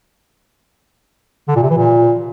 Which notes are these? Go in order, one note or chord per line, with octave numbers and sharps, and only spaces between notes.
D3
A#2
C3
E3
A#2